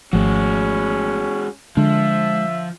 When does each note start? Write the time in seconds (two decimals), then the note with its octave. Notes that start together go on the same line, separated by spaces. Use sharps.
0.13 G#1 F3 G#3 A3 C#4 F#4
1.77 D3 F3 G#3 E5